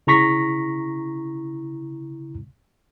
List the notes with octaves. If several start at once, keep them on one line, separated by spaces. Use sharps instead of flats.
C#3 E4 A#5 C#6 A#6 B6